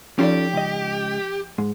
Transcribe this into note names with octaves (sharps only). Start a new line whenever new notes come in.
F3 C#4 D#4 F4 G4 A4 D5
C#2 D#5
G#2 G#3